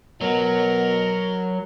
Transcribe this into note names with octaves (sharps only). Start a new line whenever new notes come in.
B2 F#3 A#4